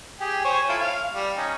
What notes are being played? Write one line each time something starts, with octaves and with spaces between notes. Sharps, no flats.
G4 G#4
C5 C#5 G#5
E4 F4 A4
F5
G3
C#4 D#4